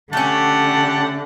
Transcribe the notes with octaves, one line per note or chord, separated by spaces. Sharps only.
D3 A3 C#4 G4 F#5 A5